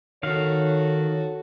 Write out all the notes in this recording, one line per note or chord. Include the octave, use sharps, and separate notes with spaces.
D#3 F#4 A4 C#5 F5